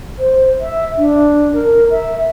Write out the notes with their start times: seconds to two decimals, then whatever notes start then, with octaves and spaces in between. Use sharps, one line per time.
0.18 C5
0.61 E5
0.97 D4
1.53 A#4
1.90 E5